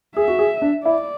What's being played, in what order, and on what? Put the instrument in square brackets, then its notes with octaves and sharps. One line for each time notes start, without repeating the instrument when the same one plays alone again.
[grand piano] G#4 [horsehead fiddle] E5
[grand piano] F#4
G#4
D4
[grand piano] E4 [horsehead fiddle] D5